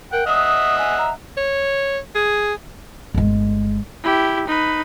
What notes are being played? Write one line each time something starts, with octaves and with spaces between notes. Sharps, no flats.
A#4 F#5 G5
D#5 E5 F#5 D#6
G#5
A#5
C#5
G#4
G1 G#3
E4 G4
D#4 B4